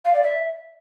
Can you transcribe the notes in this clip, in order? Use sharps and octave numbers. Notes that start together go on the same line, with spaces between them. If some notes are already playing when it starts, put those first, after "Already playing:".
F5
D5
E5